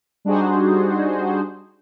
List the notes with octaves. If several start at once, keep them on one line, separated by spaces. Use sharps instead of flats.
G3 D4 D#4 F#4 G#4 C5